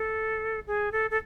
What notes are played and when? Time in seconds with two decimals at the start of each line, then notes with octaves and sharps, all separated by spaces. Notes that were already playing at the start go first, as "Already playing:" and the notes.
Already playing: A4
0.67 G#4
0.92 A4
1.11 A4